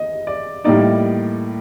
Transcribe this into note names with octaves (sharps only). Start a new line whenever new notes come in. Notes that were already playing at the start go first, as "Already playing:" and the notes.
Already playing: D#5
D5
A2 G3 A#3 D#4 D5